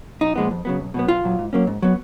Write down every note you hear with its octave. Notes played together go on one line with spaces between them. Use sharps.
B1 D#4
A#2 F3 G#3 B3
F2
C#3 F#3 B3
B1
B2 F#3 B3
B1 F4
A#2 F#3
G#2
F#3 A#3 C#4
G#2
F#3 B3